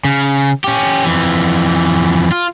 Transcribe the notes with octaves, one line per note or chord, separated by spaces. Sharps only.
C#3
C#4 G4
F2 E3
F4